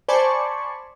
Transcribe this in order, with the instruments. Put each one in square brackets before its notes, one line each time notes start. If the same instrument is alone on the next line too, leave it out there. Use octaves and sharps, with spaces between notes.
[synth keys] C5 D5 G#5 A5 B5 C#6